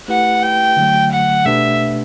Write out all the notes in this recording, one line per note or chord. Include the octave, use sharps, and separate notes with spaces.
A3 E4 G4 B4 F#5
G5
D3 F#3 A3
F#5
B2 A3 D4 G4 B4 E5